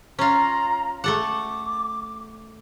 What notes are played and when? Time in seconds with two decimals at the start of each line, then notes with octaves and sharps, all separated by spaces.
0.19 C#4 F4 A#5
1.04 A3 A4 F#5 D6